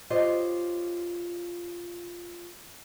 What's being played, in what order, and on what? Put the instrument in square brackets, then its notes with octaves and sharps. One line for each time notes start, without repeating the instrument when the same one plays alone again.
[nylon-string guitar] F4 G4 C5 C#5 D#5